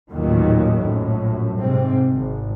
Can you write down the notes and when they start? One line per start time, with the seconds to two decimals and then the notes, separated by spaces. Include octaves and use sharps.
0.10 A1 D#2 A#2 D#3 F#3
0.78 A#1 F#2 A2
1.61 G#2 C3 C4
2.13 G#1